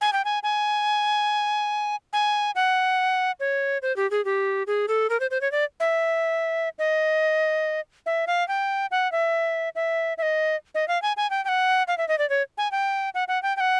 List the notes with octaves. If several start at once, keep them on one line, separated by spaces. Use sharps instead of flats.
G#5
G5
G#5
G#5
G#5
F#5
C#5
C5
G4
G#4
G4
G#4
A4
A#4
C5
C5
C#5
D5
E5
D#5
E5
F5
G5
F#5
E5
E5
E5
D#5
D#5
F5
G#5
G#5
G5
G5
F#5
F5
E5
D#5
D5
C#5
G#5
G5
F#5
F#5
G5
G5
F#5